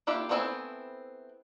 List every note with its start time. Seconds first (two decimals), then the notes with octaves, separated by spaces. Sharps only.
0.07 A#3 E4 F4 G4
0.29 A3 B3 C4 E4 G#5